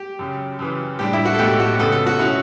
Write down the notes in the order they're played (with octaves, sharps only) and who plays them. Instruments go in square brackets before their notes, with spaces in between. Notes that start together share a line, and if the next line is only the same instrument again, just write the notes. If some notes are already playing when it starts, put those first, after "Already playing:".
Already playing: [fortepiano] G4
[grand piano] F#2 C#3 F#3
F#2 C#3 E3
[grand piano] A2 G3 D4 [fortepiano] G4
[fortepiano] E4
F#4
A4
[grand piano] B1 A2 F#3 A3 [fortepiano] G4
[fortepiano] F#4
[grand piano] F#2 C#3 F#3 B3 [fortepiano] A4
[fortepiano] A4
F#4
[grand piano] B2 F#3 C#4 E4